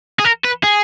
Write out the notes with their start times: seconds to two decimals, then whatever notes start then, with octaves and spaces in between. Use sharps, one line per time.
0.19 G#4
0.24 A#4
0.44 B4
0.63 G#4